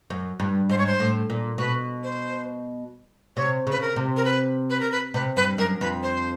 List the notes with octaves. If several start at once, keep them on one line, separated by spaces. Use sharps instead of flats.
F#2
G2
G#2 C5
C#5
C5
A2
A#2
B2 B4
C5
C3 C#5
C#3 B4
A#4
C3
A#4
B4
B4
A#4
B4
C3 B4
G2 B4
F#2 A#4
F2 B4
C5